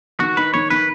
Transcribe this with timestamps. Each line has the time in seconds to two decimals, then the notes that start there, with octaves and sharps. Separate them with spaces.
0.20 D#3 F#4
0.37 D#4 B4
0.54 D#3 C#5
0.70 D#3 B4